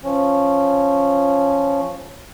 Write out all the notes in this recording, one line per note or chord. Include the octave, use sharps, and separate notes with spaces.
F3 C#4